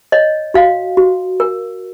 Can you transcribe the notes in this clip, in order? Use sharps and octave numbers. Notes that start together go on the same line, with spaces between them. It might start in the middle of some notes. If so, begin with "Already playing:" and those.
C#5 D#5
F#4 F5
F#4
A#4